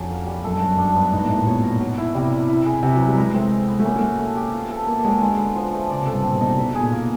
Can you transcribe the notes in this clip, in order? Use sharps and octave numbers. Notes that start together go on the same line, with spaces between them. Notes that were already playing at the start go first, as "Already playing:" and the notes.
Already playing: F2 F#3 C#4 D4
A#3
G3
F#2 A4
G2
F#2 F#4
G2 D4
G2 B3
G#2 D#4
A2
D#4
A#2
B2 C#5
A#4
F#3
E4
C3 G3
G3
E4
G#4
C3 B4
F#3
B4
G3
G#3 A#4
A3 C4
G#3
B3
A3
A#3 C#4
A3
F#4
A3
G4
F4
A4
A3 A#3
F#3 G#3
D3 G#3
B3
F3
A3
C#3 D5
C3
A4
G2
A#2 C4
B2
D#4
C3
B2 B4
B2
G#4
A#2
A#2 A#3